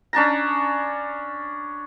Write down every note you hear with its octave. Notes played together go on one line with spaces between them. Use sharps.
C#4 D4 A5 A#5